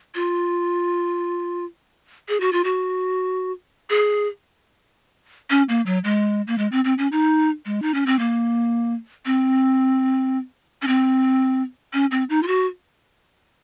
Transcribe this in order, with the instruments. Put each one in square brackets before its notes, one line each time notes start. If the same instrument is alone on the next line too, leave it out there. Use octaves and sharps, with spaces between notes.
[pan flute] F4
G#4
F#4
F4
F#4
G#4
C#4
A#3
F#3
G#3
A#3
G#3
C4
C4
C#4
D#4
G#3
D#4
C#4
C4
A#3
C4
C#4
C4
C#4
C4
D#4
F4
F#4